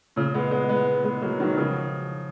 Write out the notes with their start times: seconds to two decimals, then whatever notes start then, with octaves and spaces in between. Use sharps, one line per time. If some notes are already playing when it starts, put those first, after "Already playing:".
0.16 A#2 C#3
0.34 G#3 B3
0.51 G#3 B3
0.69 G#3 B3
1.04 G#3 B3
1.22 F#3 A#3
1.40 D#3 F#3
1.57 C#3 F3